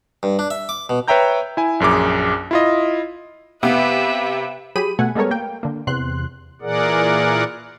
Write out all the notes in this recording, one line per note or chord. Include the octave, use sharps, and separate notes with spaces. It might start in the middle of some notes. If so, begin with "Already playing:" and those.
G2
D4
E5
D6
B2
B4 C#5 E5 G5 A#5 G6
E4 G#5
A#1 F#2 G#4 D6
E4 F4 D#5
C3 B3 B4 E5 F5
F#3 G4 G#4 B5 D#7
B2 A3 F#5 G#5
G3 G#3 B3 A4 A#4 C#5
A#3 G5
D3 A#3
E2 C3 C6 F#6
A#2 E3 G#4 A#4 D5 F#5